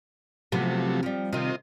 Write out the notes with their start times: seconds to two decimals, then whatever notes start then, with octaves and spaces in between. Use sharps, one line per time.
0.52 C3 F3 F#3 A3 B3
1.03 F3 G3
1.33 C3 D#3 C4 F4 D#5